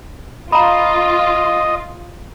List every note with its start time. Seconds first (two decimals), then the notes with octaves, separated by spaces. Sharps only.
0.52 F4 D#5 A#5 B5